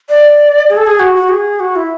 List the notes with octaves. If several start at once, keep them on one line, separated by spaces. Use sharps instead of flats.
D5
G#4
A4
G#4
F#4
F#4
G#4
F#4
E4